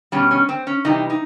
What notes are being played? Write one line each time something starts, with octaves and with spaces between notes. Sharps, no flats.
B2 G3 C#4
C#4
C4
C#4
C3 E3 G3 D#4
D#4